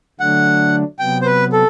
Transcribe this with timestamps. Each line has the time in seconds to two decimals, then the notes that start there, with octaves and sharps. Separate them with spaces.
0.19 D3 F#3 A3 D4 F#5
0.99 C3 F#3 B3 G5
1.22 C5
1.26 B4
1.53 A4